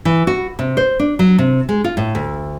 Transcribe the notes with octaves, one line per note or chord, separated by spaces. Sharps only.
E3
F#4
C3
C5
D4
F#3
C3
G#3
F4
A2
D2